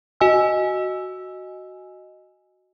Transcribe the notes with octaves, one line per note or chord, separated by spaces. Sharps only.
F#4 D#5 G#5 E6